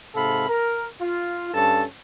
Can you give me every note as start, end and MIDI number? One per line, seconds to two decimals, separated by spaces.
0.15 0.45 44
0.15 0.45 48
0.15 0.45 69
0.15 0.45 77
0.15 0.45 83
0.49 0.86 70
1.01 1.53 65
1.54 1.85 43
1.54 1.85 61
1.54 1.85 69
1.54 1.85 81